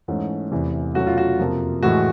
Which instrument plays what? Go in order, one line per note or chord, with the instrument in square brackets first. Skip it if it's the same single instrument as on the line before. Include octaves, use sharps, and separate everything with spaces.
[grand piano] G#2 E3 A3 C#4
E2 C3 E3 A3
B2 F#3 A3 C#4 F#4
F4
F#4
F2 C3 F3 A#3
A2 E3 G#3 F#4